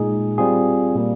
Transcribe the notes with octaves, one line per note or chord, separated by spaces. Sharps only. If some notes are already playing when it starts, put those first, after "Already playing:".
Already playing: A#2 G#3 D#4 G#4
G3 C4 F4 G#4
A#2 G3 A#3